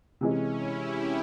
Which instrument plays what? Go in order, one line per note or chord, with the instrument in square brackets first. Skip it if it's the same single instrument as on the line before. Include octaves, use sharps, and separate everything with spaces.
[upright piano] C3 E3 G#3 [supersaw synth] C#4
[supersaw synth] E4
G4